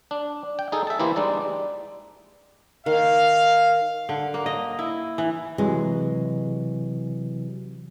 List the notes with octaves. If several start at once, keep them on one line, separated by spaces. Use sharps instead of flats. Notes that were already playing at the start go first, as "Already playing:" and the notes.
D4
G5
D#4 G#4 A4
E5 A5
E3 A#3 E4 G4 C5
G3 G#3 D4 D#4 D5
D#3 F5
D3
A#3
D#5
E4
E3
C3 E3 F#3 G#3